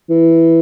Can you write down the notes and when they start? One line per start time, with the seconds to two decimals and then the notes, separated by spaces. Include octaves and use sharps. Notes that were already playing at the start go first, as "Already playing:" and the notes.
0.09 E3